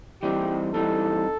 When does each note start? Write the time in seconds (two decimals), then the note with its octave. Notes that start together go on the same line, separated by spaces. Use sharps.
0.22 E3 G3 C4 D#4 G4
0.74 E3 G3 C4 D#4 A4